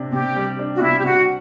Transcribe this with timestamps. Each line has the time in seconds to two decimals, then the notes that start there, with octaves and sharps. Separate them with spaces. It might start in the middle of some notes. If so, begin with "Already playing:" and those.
Already playing: C3 D4
0.12 C3 G4
0.36 G3
0.59 D4
0.76 F#4
0.81 C3 E4
0.99 G4
1.05 C3 F#4